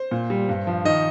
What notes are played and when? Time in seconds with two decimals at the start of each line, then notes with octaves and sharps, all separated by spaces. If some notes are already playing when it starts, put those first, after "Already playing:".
Already playing: C5
0.11 A#2
0.30 G3
0.49 G2
0.67 F3
0.85 D#3 D#5